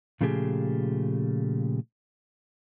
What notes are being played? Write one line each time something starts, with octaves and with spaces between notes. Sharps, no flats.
A#2 C#3 F3 A3 G4 G#4